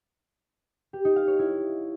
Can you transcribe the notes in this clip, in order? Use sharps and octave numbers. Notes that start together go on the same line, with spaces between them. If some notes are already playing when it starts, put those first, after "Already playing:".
G4
D#4
F5
C#5
E4